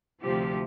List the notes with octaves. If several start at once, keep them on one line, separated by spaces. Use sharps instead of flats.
D2 C3 F3 G4